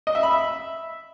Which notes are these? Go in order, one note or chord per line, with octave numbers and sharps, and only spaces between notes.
D#5
E5
B5
E5